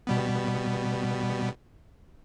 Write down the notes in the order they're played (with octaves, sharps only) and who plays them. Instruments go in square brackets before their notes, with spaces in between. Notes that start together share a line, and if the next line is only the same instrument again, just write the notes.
[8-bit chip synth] B2 G3 B3